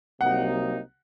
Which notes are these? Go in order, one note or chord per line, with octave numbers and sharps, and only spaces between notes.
C2 C3 F#3 A#3 D#4 F#5